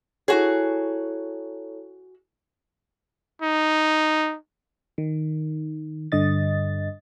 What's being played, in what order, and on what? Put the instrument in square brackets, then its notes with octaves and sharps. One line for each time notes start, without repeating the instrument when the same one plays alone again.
[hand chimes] E4 A4 C#5 [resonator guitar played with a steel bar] F#4 G#4
[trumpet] D#4
[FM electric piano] D#3
G2 D3 D#5 A6